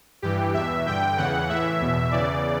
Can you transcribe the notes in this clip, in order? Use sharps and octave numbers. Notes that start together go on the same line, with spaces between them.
G2 E3 G4
E2 B2 E5
G2 D3 G5
E2 C#3 E3 F#5
A2 E3 E5
E2 B2
E2 C#3 E3 D5